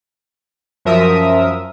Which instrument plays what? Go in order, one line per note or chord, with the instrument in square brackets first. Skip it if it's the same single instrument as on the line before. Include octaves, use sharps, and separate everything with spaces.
[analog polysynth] F#2 F3 A#4 E5 D#6